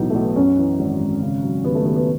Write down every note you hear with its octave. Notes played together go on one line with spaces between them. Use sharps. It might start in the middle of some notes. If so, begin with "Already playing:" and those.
Already playing: B1 A2 E3 D#4
B1 A3
B3
F#2 C#4
E3
G#1
G#1
C#3
F#3
D#2 B3
A3
D#2 B3
B3